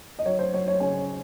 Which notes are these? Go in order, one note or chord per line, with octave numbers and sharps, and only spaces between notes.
D#5
F#3 C#5
C5
F#3 C#5
C#5
C#3 G#5